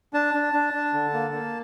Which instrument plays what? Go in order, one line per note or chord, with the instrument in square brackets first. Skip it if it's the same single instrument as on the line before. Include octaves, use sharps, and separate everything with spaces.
[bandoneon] D4 A5
D4
D4
D4
D3
A#3
A#3